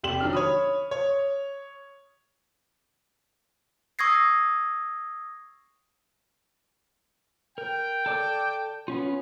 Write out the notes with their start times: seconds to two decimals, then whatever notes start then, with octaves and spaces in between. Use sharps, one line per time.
0.03 F1 G4 D5 C6 E7 F#7
0.21 D#3 F#3 D4 F6
0.33 C#5 B5 D#6
0.91 C#5
3.99 C#6 D#6 E6 G#6 A#6 C7
7.58 A#4 G5
8.06 A4 D5 D6
8.88 B3 C#4 F4